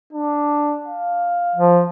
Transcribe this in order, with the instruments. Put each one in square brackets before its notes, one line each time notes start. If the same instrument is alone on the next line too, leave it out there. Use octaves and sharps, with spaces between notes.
[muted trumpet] D4
F5
[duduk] F3